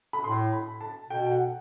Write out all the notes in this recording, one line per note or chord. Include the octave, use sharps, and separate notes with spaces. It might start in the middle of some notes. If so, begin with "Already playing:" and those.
B5
A2 C6
B5
A5
B2 G5
G5
F#5